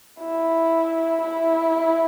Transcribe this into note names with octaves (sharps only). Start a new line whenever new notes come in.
E4
E4